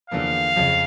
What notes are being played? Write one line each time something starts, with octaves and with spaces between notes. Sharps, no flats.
E2 D3 F3 A#3 F5
F2 C#3 F3